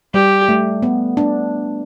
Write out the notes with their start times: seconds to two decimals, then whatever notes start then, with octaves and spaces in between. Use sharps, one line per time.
0.14 G3 G4
0.49 A3
0.82 B3
1.17 D4